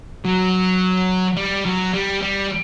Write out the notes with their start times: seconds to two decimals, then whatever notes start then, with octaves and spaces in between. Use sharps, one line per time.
0.25 F#3
1.37 G3
1.66 F#3
1.94 G3
2.23 G3